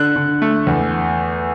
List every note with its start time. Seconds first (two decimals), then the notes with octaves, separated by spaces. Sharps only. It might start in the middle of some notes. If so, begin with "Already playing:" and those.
Already playing: D3 F#6
0.16 D3
0.42 A3
0.67 E2